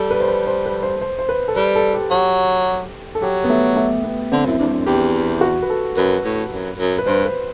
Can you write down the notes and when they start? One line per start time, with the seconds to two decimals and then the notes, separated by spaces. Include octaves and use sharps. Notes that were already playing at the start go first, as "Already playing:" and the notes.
Already playing: G3 A4
0.11 B4
0.20 C5
0.28 B4
0.47 C5
0.66 B4
0.83 C5
1.01 C5
1.19 C5
1.29 B4
1.48 A4
1.56 G3 B4
1.76 A4
1.93 G4
2.11 F#3 G4
3.15 A4
3.22 F#3 G4
3.44 B3
3.50 A3
3.76 A3
4.04 B3
4.32 D3 C4
4.45 F#2 E4
4.59 E2 D4
4.67 G2
4.73 F#2
4.86 E2 G4
5.41 F#4
5.62 B4
5.70 A4
5.97 F#2 B4
6.25 A2
6.52 F#2
6.79 F#2
6.98 B4
7.06 G2 C5
7.25 B4